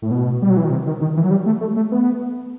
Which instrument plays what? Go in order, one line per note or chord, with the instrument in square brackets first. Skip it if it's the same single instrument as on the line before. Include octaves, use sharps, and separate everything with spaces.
[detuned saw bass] A2
B2
G3
F#3
E3
D#3
C3
D#3
D#3
E3
F#3
G3
A3
A3
A3
B3